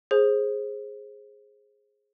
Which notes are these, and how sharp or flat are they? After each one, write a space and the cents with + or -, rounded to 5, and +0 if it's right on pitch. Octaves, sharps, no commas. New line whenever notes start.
G#4 +0 C5 +25